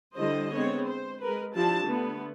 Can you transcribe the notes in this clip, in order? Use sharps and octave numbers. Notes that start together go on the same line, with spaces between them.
D3 G3 E4 G4 C5 D#5
G#3 B3 C4 C#5
C5
G#3 A#4 B4
F3 D4 E4 F4 G4 A5
D3 A3 B3